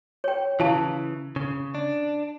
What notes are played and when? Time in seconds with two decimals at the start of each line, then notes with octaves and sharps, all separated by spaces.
0.24 C#5 G5
0.60 C#3 E3 E4 F5 A5
1.36 C#3
1.75 D4